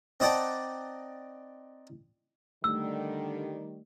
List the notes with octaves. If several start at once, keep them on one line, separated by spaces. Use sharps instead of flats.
C4 D#4 D5 F#5 G5 A5
D3 D#3 G3 A3 E6